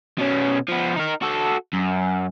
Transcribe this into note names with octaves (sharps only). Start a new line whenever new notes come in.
B2 C#4
F3 B3
D#4 A#4
F#4 A4
F#2